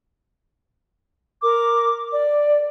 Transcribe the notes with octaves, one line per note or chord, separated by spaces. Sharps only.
A#4 D6
D5